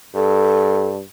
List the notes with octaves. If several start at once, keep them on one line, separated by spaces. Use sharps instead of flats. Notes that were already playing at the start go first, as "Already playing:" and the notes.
G2 A4